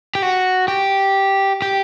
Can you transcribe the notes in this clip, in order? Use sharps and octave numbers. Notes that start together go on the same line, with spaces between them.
G4
F#4
G4
G4